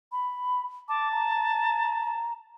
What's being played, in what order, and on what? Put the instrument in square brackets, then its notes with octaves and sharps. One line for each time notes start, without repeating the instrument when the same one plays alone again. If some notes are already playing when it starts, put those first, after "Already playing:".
[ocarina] B5
[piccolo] A5 [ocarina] D6
[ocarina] A#5